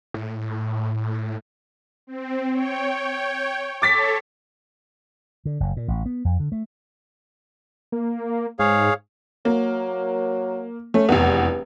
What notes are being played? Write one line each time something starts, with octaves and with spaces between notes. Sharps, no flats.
A2
C4
C#5 G5
A4 C#5 D6 A6 B6
D3
F#1
A#2
A1
B3
F2
D3
A3
A#3
G#2 G#4 C#5 F5
F#3 A#3
A3 C#4
F1 E2 G2